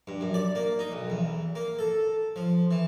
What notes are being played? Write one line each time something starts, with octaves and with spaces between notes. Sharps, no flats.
G2
F#2
D5
A#3
D#4
B1
E2
A#3
A4
F3
E3